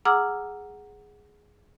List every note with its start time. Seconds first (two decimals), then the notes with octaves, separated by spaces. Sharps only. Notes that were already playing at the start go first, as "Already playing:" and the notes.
0.05 G#4 F#5 A#5 D6 E6 F6